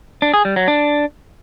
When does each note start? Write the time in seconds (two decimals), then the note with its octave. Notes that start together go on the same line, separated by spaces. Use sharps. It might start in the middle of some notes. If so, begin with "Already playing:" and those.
0.22 D4
0.34 G#4
0.45 G3
0.56 F#3
0.68 D4